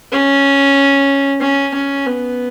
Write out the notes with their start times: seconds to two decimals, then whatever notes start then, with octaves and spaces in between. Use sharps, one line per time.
0.12 C#4
1.41 C#4
1.74 C#4
2.06 B3